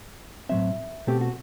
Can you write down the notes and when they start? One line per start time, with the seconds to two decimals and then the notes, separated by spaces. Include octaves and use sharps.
0.49 A2 F#3 C4 E5
1.07 B2 A3 C4 G4
1.21 F#4